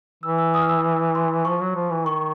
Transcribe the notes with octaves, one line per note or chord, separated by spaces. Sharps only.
E3 E6
E6
D#6
F6
E6
C6
F3 C#6
F#3
F3
E3
D#3 C#6